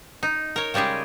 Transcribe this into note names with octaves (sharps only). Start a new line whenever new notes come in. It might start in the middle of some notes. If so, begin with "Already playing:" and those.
D#4
A#4 C#5
C#3 G3 G#3 G4 G#4